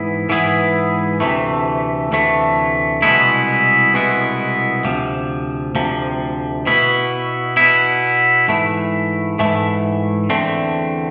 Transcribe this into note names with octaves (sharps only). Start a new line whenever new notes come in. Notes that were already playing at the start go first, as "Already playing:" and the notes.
Already playing: G#2 E3 B3 E4 G#4
G#2 E3 B3 E4 G#4
D2 C3 E3 A3
D2 C3 E3 A3
C2 B2 G#3 B3 E4
C2 B2 G#3 B3 E4
D2 C3 F3
D2 C3 F3
B2 B3 E4
B2 B3 E4
G#2 E3 A3 E4
G#2 E3 A3 E4
E2 D3 A3 C4